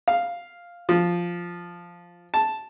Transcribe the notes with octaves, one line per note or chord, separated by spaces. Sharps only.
F5
F3
A5